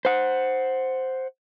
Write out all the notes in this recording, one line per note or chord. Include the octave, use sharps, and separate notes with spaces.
C5 F#5